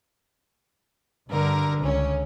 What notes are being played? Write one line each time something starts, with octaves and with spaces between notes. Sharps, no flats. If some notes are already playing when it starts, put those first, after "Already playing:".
G2 D3 A#4
C#2 C#4